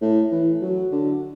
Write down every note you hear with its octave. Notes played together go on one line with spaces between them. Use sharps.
A2
E3
F#3
D3